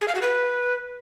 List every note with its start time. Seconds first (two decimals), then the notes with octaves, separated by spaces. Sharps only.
0.01 G#4
0.08 F5
0.15 F#4
0.22 B4